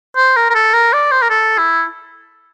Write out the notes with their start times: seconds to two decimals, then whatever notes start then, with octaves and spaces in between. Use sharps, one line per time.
0.16 C5
0.36 A#4
0.50 A#4
0.54 A4
0.73 A#4
0.93 D5
1.11 C5
1.22 A#4
1.30 A4
1.58 E4